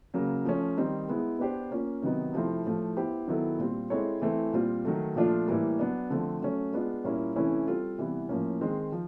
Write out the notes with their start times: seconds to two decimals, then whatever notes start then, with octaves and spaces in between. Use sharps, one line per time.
0.14 C#3 F#3 A#3
0.45 F3 A3 C#4
0.77 D#3 G3 C4 D#4
1.09 G#3 B3 E4
1.39 B3 D4 G4 C5
1.71 A#3 C#4 F4
2.02 C3 D#3 F#3 B3 D#4
2.33 C3 F3 A3 C4 E4
2.65 A2 F3 A3
2.97 B3 E4 G4 C5
3.28 D#3 F#3 B3 E4 A4
3.59 A#2 G3 C4
3.90 G#3 C4 E4 A4 C#5
4.22 E3 A3 C4 E4
4.53 A#2 G3 C4 F4
4.85 D#3 F#3 A3
5.16 A#2 F3 A3 D4 F4
5.47 A2 E3 G3 A#3
5.79 F#3 B3 D4
6.10 D3 F3 A3 C4
6.42 F#3 A3 C#4
6.73 G#3 B3 D4 F4
7.04 A#2 G3 A#3 C#4 E4
7.36 C3 E3 A3 C#4 E4
7.67 G3 C4 F4 A4
7.98 C3 E3 G3 B3 E4
8.29 A2 F3 A#3 C#4
8.61 D#3 G#3 C4
8.92 F3